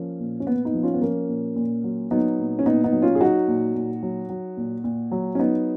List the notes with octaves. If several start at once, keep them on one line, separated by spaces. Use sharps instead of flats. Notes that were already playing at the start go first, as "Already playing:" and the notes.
Already playing: F3 A#3 C#4
A#2
C#4
A#2 B3
B3 D#4
F3
C#4 F4
B3
F3 A#3 C#4
A#2
A#2
F#3
F#3 B3 D#4
A#2
C#4
A#2 B3 D#4
B3 D#4
F#3
C#4 F4
G#4
F#3 D#4 F#4
A#2
A#2
F#3
F#3
A#2
A#2
F#3
C#4
F#3 B3 D#4